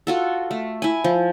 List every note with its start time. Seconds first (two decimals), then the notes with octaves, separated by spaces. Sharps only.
0.07 F4 F#4 A4
0.51 A3
0.82 E4 G#5
1.04 F3